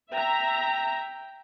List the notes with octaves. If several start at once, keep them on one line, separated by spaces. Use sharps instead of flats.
E5 G5 A#5